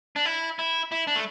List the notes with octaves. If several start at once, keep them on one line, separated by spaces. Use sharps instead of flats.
D4
E4
E4
E4
D4
A3